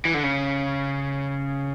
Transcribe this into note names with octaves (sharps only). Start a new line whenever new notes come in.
E3
D3
C#3